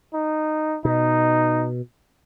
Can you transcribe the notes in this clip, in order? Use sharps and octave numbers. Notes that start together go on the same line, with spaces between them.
D#4
B2 D#4